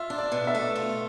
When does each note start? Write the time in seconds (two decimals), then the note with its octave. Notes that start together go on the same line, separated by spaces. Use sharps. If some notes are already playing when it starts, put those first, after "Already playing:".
Already playing: F4 E5
0.10 D4
0.18 D5
0.32 B2
0.47 E5
0.55 A3
0.76 F4